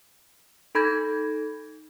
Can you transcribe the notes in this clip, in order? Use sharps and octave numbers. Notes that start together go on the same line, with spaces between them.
D#4 A4 B5 G6 G#6 A#6